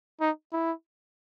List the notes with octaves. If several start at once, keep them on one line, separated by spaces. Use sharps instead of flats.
D#4
E4